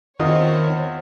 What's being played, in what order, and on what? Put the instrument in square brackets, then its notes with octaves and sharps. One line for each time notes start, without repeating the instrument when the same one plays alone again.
[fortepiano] E2 F4 D#5 [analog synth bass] D#3 [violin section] C4 C#5